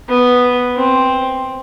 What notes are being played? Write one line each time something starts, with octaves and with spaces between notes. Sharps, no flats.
B3
C4